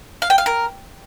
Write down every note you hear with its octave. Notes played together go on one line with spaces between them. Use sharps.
F5
G5
F5
A#4